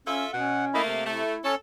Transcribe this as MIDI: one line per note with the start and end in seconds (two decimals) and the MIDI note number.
0.07 0.25 61
0.07 0.32 65
0.07 0.32 69
0.07 0.32 76
0.33 0.67 47
0.33 0.77 61
0.33 0.65 78
0.74 1.03 57
0.74 1.03 58
0.74 0.82 64
0.74 0.82 75
0.74 0.82 83
0.86 1.23 48
1.06 1.34 57
1.06 1.46 64
1.44 1.55 61
1.44 1.55 69
1.44 1.55 73